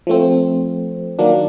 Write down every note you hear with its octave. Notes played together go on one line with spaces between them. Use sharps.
F3 A3 C4
D#3 F#3 A#3 D4